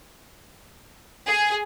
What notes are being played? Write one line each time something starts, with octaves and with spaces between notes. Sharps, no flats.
G#4